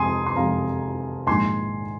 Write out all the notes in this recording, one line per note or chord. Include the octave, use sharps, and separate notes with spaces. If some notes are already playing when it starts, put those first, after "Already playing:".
Already playing: F2 C3 G#3 G#5 C6 D#6
C6
F2 C3 G#3 F5 A#5
A#1 G#2 D#3 G#3 G#5 C6